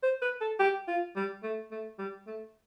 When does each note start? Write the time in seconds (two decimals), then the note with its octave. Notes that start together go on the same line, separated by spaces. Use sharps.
0.03 C5
0.22 B4
0.41 A4
0.59 G4
0.88 F4
1.16 G3
1.43 A3
1.71 A3
1.99 G3
2.27 A3